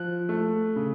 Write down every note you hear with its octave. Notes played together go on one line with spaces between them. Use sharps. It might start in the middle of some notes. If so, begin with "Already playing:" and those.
Already playing: F3 F#6
A3
C#3